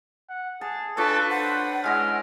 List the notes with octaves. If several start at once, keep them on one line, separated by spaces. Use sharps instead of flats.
F#5
G#4 A5
D4 F4 A4 B4 C#5 D5
C5 F#5
G#3 E4 D#5 F6